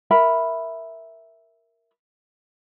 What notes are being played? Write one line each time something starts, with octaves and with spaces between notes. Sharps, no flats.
A#4 E5 B5